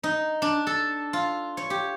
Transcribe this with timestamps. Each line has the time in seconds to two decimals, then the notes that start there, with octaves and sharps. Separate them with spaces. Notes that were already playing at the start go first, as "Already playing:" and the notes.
0.03 D#4
0.42 D4
0.67 A4
1.13 F4
1.57 C#5
1.70 G4